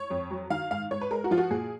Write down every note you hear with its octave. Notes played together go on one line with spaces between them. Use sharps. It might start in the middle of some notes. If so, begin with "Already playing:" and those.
Already playing: C#5
F2
F#3
D#3 F5
G#2 F5
G#2 C#5
B4
G#3 A#4
F#4
F3 F4
F#4
A#2 G#4